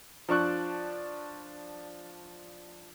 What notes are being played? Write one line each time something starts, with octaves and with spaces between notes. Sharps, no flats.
F3 D4 C#6 F#6